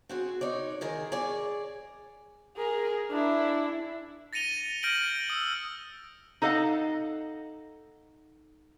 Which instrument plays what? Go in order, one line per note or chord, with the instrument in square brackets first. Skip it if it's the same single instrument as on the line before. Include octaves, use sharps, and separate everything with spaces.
[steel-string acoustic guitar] C4 F#4 G#4
D#4 C#5 D5
D#3 G#4 A#4
G#4 C#5 D5
[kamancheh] G#4 A#4
D4 E4
[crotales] A6 A#6 C#7 D#7 F7 G7
F6 G6 A#6 D7 D#7 F#7
D#6 E6
[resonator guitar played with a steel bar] D#4 A4 D#5 F5 F#5